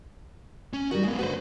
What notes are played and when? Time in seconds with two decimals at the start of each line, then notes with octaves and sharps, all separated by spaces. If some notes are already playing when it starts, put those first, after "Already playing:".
0.73 C#4
0.91 D#3 G3 F#4
1.04 G#3 B3 C#4
1.19 D3 A3 F#4 B4 C5